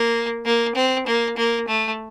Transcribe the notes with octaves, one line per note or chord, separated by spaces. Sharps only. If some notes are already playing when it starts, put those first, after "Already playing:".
Already playing: A#3
A#3
C4
A#3
A#3
A3